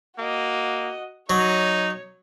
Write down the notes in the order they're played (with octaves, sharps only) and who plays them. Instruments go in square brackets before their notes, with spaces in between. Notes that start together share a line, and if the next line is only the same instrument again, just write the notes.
[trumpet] A#3 [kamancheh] F#4 D#5
[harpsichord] F#3 [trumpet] D#4 [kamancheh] C#5